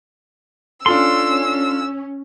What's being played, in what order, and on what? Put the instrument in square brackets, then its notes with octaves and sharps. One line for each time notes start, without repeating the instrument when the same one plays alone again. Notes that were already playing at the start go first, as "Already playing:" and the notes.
[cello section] C#4 [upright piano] D4 F4 A4 [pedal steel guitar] C6 [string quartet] E6